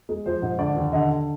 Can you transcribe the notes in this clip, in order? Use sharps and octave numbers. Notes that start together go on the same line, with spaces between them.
G#3
F3 C5
G#2
D3 D5
D#2
D3 D#5
D3